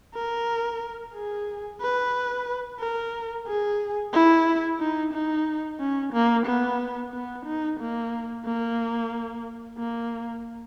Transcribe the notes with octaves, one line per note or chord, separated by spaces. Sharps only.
A#4
G#4
B4
A#4
G#4
E4
D#4
D#4
C#4
A#3
B3
B3
D#4
A#3
A#3
A#3